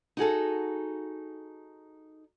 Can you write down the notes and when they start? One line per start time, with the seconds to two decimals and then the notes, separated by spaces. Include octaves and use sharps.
0.17 D#4 F#4 G#4 A4